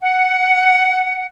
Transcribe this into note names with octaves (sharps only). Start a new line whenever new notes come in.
F#5